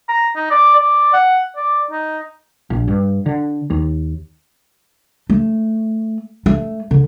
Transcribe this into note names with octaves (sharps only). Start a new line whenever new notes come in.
A#5
D#4
D5
D5
F#5
D5
D#4
A#1
G2
D3
D#2
A3
A3
D3